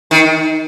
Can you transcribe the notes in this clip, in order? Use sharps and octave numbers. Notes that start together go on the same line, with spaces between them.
D#3